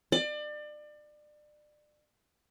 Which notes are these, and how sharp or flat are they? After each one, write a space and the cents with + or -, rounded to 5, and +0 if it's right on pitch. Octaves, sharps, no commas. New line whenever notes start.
D5 +30